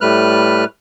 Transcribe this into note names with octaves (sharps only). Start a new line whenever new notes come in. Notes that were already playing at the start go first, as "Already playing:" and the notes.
A2 G3 A3 B4 F6 F#6